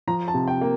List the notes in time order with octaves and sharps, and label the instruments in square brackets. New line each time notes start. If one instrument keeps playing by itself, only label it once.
[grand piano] F3 A#5
A5
C3
G5
A#3